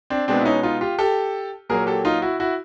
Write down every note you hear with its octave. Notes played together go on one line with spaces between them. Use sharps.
C4 D4
B2 G#3 B3 C4 D4
E4
C#4 D#4
D#4 F4
F4 G4
G4 A4
A#2 F#3 A#3 G#4 A#4
G4 A4
D#4 F4
E4 F#4
E4 F#4